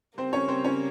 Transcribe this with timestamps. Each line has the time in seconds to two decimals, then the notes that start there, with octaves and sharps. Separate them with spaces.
0.18 C#3 G3 A#3 C4 C5
0.33 C#4 C#5
0.48 C4 C5
0.64 C#4 C#5